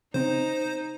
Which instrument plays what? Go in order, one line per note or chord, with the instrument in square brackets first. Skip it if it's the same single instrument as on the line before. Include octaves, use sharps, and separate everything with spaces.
[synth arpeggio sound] C#3 C4 [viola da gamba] D#4 [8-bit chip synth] C5